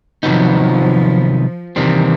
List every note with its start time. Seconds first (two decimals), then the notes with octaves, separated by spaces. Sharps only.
0.23 C3 D#3 F3 F#3 B3 D#4
1.76 C3 D#3 E3 G3 C4